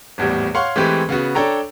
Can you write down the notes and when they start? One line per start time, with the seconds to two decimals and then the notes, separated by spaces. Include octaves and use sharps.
0.18 G#1 E2 A2 G3
0.54 C#5 F5 F#5 C6 C#6
0.76 E3 G#3 A3 C4 G4 B4
1.09 C#3 B3 F#4
1.35 D4 A4 C#5 G5 A#5